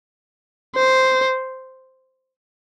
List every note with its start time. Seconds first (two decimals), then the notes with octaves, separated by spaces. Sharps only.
0.76 C5